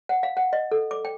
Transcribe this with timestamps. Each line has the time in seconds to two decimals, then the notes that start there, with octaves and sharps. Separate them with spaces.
0.09 F#5
0.23 F5
0.37 F#5
0.53 D#5
0.71 A4
0.91 D6
1.05 G5